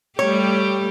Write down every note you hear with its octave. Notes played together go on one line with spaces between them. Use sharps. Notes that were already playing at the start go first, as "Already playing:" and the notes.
G3 A3 G4 C#5